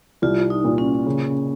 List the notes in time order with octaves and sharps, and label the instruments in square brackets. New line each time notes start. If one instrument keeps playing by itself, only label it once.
[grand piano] C2 [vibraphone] F4
[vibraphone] D#4
[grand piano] A#2
[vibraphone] C#4
[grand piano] C#3